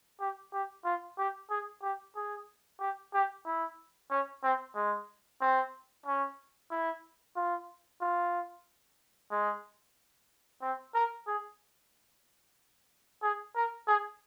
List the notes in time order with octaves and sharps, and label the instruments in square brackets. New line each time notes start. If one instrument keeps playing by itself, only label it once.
[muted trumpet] G4
G4
F4
G4
G#4
G4
G#4
G4
G4
E4
C#4
C4
G#3
C4
C#4
E4
F4
F4
G#3
C4
A#4
G#4
G#4
A#4
G#4